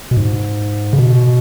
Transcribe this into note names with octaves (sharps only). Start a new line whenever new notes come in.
B2
G#2
C#3
B2